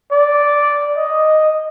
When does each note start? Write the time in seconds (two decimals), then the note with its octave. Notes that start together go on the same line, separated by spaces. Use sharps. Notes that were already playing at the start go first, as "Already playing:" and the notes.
0.12 D5
0.97 D#5